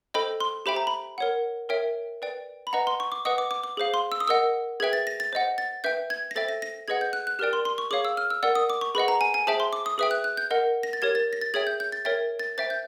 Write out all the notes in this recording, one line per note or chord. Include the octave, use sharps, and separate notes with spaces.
A4 C5 D#5 G5 B5
C6
G4 C5 E5 G5 B5
A#5
B5
A#4 C#5 F#5
A#4 C#5 E5 G5
B4 D5 G5
B5
B4 D#5 F#5 A#5
C6
C#6
D6
B4 D#5 F#5 D#6
D6
D6
D6
G#4 C5 F5
C6
E6
D#6
A#4 D#5 F#5 E6
G#4 B4 E5 G5 G#6
A6
A#6
A6
C5 D#5 F#5
A6
B4 E5 G5 G6
G#6
A#6
A4 C5 E5 G5 A6
A#6
A#6
G#4 B4 D#5 F#5 G#6
G6
F#6
F#6
G4 A#4 D5 G5 F6
C6
C6
C#6
G#4 C#5 F5 D6
E6
F6
E6
A#4 D5 F#5 E6
D#6
D6
C#6
G#4 B4 D#5 F#5 B5
A#5
G#5
G#5
G#4 C5 E5 G5 A5
C6
D6
D#6
G#4 B4 E5 G5 D#6
F#6
F#6
G6
A#4 D#5 F#5
A#6
A6
G4 A#4 C#5 G#6
A6
A#6
A6
G#4 C#5 E5 G5 G#6
G6
G6
A6
A#4 C#5 E5 G5 A6
A6
C5 E5 G5 A6
G6